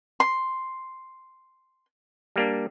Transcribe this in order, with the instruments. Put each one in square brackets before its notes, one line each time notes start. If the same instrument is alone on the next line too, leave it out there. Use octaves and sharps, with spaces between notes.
[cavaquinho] C6
[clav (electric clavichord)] G3 A#3 D4